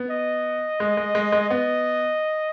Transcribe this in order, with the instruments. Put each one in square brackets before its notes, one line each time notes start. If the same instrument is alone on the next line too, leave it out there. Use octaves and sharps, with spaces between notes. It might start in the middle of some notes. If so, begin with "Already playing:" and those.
Already playing: [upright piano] B3
[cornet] D#5
[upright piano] G#3
G#3
G#3
G#3
[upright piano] B3 [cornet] D#5